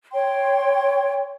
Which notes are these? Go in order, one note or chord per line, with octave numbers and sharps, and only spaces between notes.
C#5 G5 C6